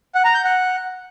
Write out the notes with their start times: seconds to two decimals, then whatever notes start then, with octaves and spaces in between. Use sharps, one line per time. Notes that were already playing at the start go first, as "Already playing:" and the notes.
0.15 F#5
0.25 A#5
0.34 G6
0.44 F#5